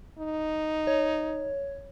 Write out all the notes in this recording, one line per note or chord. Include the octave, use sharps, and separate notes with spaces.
D#4
C#5